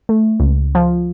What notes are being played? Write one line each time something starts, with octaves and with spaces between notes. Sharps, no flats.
A3
C#2
F3